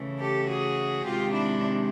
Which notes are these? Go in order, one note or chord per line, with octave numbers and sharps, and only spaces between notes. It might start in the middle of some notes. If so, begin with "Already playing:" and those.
Already playing: C#3 E3 A3
G4 A4
F#4 G#4
C3 D#3 G#3 F4 G4
D4 E4